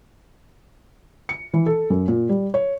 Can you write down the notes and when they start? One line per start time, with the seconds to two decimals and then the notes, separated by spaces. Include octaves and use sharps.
1.29 C#7
1.54 E3
1.66 A4
1.90 F#2
2.08 A#2
2.29 G3
2.54 C#5